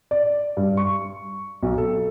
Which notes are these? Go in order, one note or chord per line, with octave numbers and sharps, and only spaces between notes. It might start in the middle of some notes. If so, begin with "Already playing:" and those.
D5
G2
C#6
B1
A4